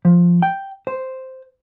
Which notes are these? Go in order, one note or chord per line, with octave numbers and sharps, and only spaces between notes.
F3
G5
C5